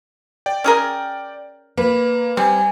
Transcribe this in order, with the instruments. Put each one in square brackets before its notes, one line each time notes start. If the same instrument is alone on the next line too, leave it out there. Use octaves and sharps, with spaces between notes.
[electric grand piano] D5 G5
[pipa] C#4 G#4 A#4
[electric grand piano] A#3 [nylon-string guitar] B4
[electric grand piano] G3 [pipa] C4 [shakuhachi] G#5